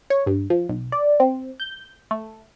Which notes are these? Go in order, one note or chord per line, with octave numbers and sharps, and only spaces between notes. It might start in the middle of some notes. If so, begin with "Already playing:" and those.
C#5
G2
F3
B1
D5
C4
G6
A3